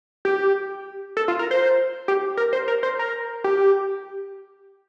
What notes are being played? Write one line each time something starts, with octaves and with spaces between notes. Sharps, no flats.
G4
A4
F4
A#4
C5
G4
A#4
C5
A#4
C5
A#4
G4